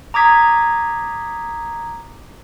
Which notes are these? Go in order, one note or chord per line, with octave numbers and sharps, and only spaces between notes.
A#5 D6 D#6 G#6 B6